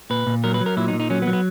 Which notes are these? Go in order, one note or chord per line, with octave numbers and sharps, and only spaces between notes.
A#2 B4
A#2
F#3 A#4
B4
F#3
A#4
A#2 E4
D#4
A#2
D#4
F#3 C#4
B3
F#3
B3